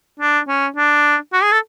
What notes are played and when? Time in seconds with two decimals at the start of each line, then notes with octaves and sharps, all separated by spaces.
0.20 D4
0.48 C#4
0.76 D4
1.33 F#4
1.43 G#4
1.52 A4